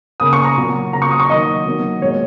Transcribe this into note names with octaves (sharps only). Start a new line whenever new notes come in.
C#3 A#3 D#6
C#6
A#5
A#2 F#3 A#3
C#3 F#3 A#3 A#5
C#6
D#6
C#6
D#3 F#3 A#3 D#5
D#3 F#3 A#3
A#2 G#3 C#5